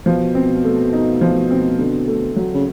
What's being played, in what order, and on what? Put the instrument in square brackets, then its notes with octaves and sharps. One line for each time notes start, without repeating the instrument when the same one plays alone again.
[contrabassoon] B2 [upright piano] F3
[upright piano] C4
A3
D#4
F3
C4
D3
A3
F#3
[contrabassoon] C#3